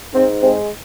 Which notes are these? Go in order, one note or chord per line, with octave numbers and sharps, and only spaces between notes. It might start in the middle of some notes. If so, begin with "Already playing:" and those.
G#2 C4
G#3 C4